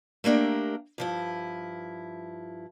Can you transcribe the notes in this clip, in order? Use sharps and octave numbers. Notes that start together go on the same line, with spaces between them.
A3 A#3 D4 G4 A#4
G2 F3 E4